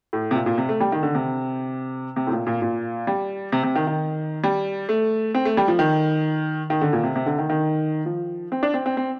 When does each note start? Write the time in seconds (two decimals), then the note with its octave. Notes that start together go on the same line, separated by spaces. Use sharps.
0.13 A2
0.31 C3
0.35 A#2
0.46 A#2
0.58 C3
0.69 A3
0.81 G3
0.92 D#3
1.03 D3
1.15 C3
2.16 C3
2.27 A2
2.32 A#2
2.47 A#2
2.62 A#2
3.07 G3
3.52 C3
3.63 C3
3.76 D#3
3.87 D#3
4.44 G3
4.89 A3
5.35 C4
5.45 A3
5.57 G3
5.68 F3
5.79 D#3
6.70 D#3
6.82 D3
6.93 A#2
7.04 C3
7.16 C3
7.26 D3
7.39 D#3
7.50 D#3
8.06 F3
8.52 C4
8.63 D4
8.74 C4
8.86 C4
8.97 C4